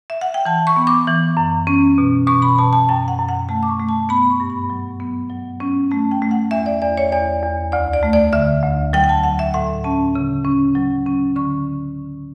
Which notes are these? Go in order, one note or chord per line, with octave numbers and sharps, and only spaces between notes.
E5
F#5
G5
E3 A5
C#6
B3
D6
E3
F#2
C#4
B2
B2 C#6
B5
B2 A5
A5
F#2 G5
F#5
F#2
F#5
A3 A5
D6
C#6
A3
A5
B3 B5
C#6
G2
B5
F#3
B3
F#3
C#4
A3 A5
G5
A3
F#5
E2 E5
D5
E2 D5
C#5
E2 D5
E2
D2 D5
D5
A3
D5
D3 E5
D2
F#3 G5
G5
A5
F#3 F#5
E5
A2 F#5
C#4 A5
C#3
C#4
F#3
C#4
D3 C#6